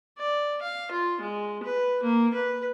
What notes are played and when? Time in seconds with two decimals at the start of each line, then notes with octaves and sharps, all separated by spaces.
0.18 D5
0.62 F5
0.91 F4
1.20 G#3
1.63 B4
2.03 A#3
2.34 B4